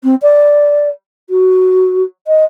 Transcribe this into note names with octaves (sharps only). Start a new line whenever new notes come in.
C4
D5
F#4
D#5